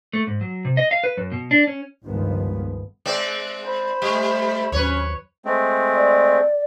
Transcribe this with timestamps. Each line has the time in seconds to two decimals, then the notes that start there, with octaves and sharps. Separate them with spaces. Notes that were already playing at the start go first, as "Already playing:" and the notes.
0.13 A3
0.27 G#2
0.41 F#3
0.65 C3
0.77 D#5
0.91 F5
1.04 B4
1.17 F#2
1.32 B2
1.51 D4
1.67 C#4
2.05 G1 C#2 D#3 F3 G#3 B3
3.06 G#3 C4 D5
3.63 C5 B5
4.02 G3 A3
4.72 D#2 F#3 C#4 B4 C#5
5.45 G#3 A3 C4
5.93 D5